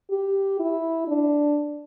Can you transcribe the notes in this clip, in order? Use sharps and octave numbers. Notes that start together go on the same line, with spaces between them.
G4
E4
D4